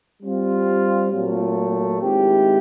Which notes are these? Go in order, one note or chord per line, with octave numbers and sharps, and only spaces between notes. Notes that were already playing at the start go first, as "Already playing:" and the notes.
G3 C4 F4
A#2 F#3 A3
D#3 G#3 C4 E4 G4